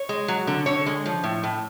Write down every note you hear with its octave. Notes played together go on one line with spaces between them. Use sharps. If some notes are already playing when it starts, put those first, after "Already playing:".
Already playing: C#5
G#3
F#3
D3
D3 C#5
G#3
F3
A2
A2